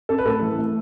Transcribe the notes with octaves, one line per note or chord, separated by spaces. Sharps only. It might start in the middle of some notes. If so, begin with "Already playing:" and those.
C#4 A4
B4
A2 A4
E3
A3